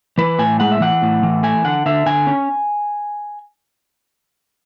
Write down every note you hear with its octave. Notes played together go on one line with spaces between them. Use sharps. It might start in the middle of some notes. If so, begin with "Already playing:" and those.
E3 B4
A2 G#5
G#3 F#5
E5
E3 F#5
A2
E3
A3 G#5
D3 F#5
D3 E5
D3 G#5
C#4